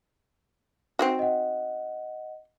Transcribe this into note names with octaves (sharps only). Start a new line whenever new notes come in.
C4 D#4 F#4
D#5 F#5